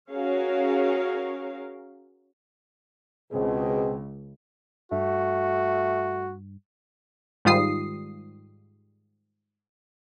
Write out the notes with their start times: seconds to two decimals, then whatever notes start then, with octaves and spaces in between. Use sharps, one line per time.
0.11 C#4 F#4 G#4 A#4 C#5 F5
3.32 C#2 B2 C4 G#4
4.92 G2 A3 F#4
7.45 G#2 D#3 G3 F4 D#6 C7